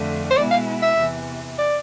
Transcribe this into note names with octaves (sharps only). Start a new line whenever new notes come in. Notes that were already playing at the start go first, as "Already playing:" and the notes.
Already playing: F2 D3 A3
C5
B2 G#3 B3 E4 D5
F5
E5
E2 C3 E3
D5